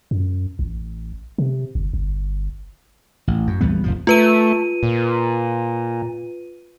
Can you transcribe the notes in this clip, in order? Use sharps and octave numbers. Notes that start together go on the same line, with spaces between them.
F#2
A1
C3
G1
G1
A1
F#2
A#1 E2 G3 B3
F1 B1 F3
A3 F4 B4 D#7
A#2